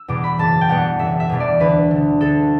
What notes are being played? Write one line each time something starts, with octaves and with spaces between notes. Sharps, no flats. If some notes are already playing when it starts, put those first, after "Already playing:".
Already playing: E6
E2 B2 G3 D6
B5
F#1 A5
G5
E2 B2 G3 F#5
F#1 E5
E5
E2 B2 G3
D5
D2 B4
D3 A3
D2 A4